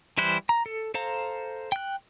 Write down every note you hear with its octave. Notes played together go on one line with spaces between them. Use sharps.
E3 G3 E4 C5 F#6
A#5
A4
A4 C5 F5 A#5
G5 F#6